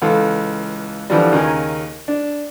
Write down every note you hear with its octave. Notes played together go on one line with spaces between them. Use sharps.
C#2 E3 A4 F5
D3 E3 F3 G3
D#2 C#3 A#4 G#5
D4